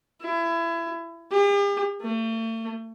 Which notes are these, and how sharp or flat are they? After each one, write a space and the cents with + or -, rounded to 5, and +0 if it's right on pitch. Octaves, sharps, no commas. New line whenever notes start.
E4 +25
G4 +45
A3 +40